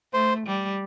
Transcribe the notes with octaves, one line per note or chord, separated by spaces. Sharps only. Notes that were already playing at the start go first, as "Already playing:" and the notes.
A3 C5
G3